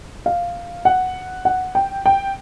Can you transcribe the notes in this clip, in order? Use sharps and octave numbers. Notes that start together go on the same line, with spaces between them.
F5
F#5
F#5
G5
G5